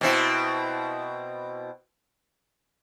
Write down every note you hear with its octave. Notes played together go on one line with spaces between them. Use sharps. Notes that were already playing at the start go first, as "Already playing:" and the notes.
B2 C4 E4